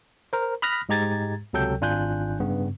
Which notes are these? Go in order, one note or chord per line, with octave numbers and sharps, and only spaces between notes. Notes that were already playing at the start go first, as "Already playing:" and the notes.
A#4 C5
B5 D#6 F6 F#6 A#6 B6
G#2 G#3 G4 A#5 G#6 A6
C#2 C3 F#3 A4 G5 G6
G#1 D4 F4 G#5 F#6 G6
G2 C#3 B3